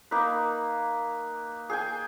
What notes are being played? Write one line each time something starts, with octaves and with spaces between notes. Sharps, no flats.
A#3 D#4 B4
G#4 G5 G#5